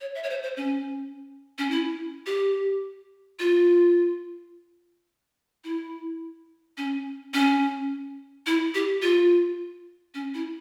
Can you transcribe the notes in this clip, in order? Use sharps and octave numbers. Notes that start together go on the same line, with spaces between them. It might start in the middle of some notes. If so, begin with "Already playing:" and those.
C#5
E5
C#5
C5
C5
C#4
C#4
E4
G4
F4
E4
C#4
C#4
E4
G4
F4
C#4
E4